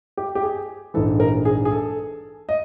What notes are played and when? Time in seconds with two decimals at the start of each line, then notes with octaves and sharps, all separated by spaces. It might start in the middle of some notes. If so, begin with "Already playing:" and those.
0.17 G4
0.35 G4
0.43 G#4
0.94 A#1 G#2 E3 A4
1.20 A#4
1.45 G#4
1.65 G#4
1.71 A4
2.49 D#5